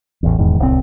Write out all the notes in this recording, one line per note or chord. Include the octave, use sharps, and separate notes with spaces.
A1 E2
D#1 E2 G#2 D#3
D1 C2 D3 C4